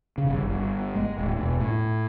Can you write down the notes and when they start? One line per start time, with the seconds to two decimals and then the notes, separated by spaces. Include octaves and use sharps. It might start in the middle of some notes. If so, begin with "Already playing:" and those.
0.18 C#3
0.29 G1
0.48 G1
0.95 G#3
1.18 D1
1.36 E1
1.61 A2